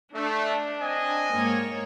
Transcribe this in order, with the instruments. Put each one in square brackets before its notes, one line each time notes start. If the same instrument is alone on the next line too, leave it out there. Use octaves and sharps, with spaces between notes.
[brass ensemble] A3 [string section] D4
[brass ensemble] C4 D#5 G#5
[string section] G#2 A#3 C#5